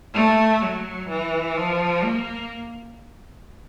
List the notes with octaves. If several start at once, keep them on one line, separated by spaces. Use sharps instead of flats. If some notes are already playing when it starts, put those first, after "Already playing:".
A3
F#3
E3
F3
A#3